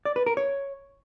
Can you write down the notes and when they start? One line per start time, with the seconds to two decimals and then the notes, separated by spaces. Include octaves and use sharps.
0.05 D5
0.16 B4
0.26 A#4
0.37 C#5